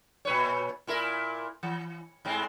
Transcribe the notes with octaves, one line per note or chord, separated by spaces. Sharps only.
A#2 B4 C#5
A#2 E4 A#4
E3
G#2 G#3 C4